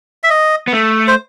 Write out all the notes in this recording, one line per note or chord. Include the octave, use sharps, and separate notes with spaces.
E5
D#5
B3
A3
C5